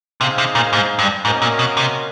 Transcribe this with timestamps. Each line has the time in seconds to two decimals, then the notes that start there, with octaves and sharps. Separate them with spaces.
0.20 C3 D#4 G#4 C5 F5
0.38 C3
0.55 A#2
0.73 G#2
0.99 G2
1.25 G#2 A#3 C#4 F#4 A#4 D#5
1.42 A#2
1.59 B2
1.77 C3